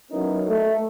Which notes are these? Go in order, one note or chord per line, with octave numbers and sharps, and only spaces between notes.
F#3 B3 C#4 D#4 E4 A#4
A3